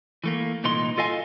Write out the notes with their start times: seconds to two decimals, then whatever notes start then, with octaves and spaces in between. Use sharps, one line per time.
0.24 E3 A3 A#3
0.64 C2 A#2 E3 D#4 C6
0.98 F4 A4 D#5 F5 G#5